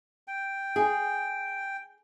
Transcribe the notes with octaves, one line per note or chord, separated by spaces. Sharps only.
G5
G#4